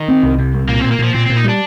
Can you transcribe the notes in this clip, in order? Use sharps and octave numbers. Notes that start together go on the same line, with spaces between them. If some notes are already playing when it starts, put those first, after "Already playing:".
Already playing: D#3
C4
C2
C3
C2
A#2 A#3
C4
A#2
A#3
A#2 F3
A#2 C4
A#2 C4
D#4
G3 D4